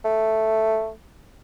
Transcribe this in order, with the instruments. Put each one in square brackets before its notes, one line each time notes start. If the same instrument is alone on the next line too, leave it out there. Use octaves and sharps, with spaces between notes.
[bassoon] A3